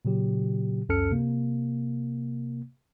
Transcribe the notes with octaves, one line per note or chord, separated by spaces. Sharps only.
A#2 C#3 F#3 G4
C#2 F#2 C#4 A4 F6 C#7
C3 A#3